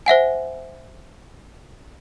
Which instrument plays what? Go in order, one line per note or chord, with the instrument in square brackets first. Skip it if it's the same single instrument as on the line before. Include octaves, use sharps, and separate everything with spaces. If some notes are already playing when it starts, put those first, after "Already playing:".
[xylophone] C5 E5 F#5 G#5